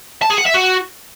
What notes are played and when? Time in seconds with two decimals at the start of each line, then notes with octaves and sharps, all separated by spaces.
0.22 A5
0.30 G#4
0.38 F#5
0.46 E5
0.54 F#4